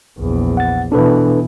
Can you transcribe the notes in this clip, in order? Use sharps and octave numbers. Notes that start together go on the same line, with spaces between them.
A#1 E2
F#5 A6
B2 E3 D4 A4 B4